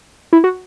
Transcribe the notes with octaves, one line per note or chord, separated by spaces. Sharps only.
E4
F#4